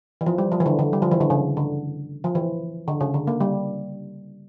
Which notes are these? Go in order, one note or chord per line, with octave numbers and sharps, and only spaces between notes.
E3
F3
G3
F3
E3
D3
D3
G3
F3
E3
D3
C#3
D3
F3
E3
D3
C#3
D3
A#3
G3